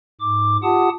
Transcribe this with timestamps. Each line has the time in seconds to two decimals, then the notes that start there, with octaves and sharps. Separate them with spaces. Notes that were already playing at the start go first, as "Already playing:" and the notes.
0.21 G#2 D6
0.63 F4 G4 F#5 A5 D#6